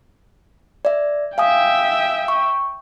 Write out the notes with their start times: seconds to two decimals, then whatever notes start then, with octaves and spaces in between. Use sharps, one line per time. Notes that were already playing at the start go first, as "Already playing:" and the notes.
0.85 D5 E5
1.38 E5 F5 G5 G#5 D#6
2.28 C#6